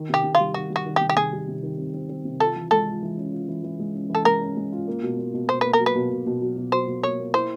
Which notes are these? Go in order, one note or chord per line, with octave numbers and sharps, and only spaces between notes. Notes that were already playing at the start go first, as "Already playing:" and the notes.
Already playing: D#3
C3 G4
C3
F4
G3
D#3 F#4
G3
F#4
D#3
G4
C3
G4
C3 G#4
G3
C3
D#3
C4
C4
C4
C3
F4 A4
E3
G#3 A4
F4
E3
C#4
F4
E3
E3
G#3
C#4
E3
A4
G#3 A#4
C#4
G#3
F4
A#3
B2
A#3
B2
B2 C5
A#3 B4
A#4
F#3
B4
B2
B2
B2
F#3
B2
F#3 C5
B2
A#3 C#5
A#3
E4 C5